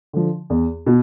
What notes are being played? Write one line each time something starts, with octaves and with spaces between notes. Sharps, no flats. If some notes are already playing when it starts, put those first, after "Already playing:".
D3 F3
E2
B2